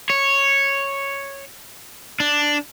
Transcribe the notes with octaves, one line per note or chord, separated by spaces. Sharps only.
C#5
D4